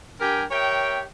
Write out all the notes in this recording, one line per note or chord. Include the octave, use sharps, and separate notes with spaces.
G2 G4 A#4 G5 G#5
G4 A#4 C#5 E5 G5